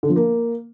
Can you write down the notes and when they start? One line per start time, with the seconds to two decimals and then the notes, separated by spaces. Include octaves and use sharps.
0.03 D3
0.10 F3
0.16 A#3